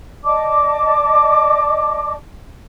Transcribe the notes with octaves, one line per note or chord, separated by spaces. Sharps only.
D5 D#5 A5 D6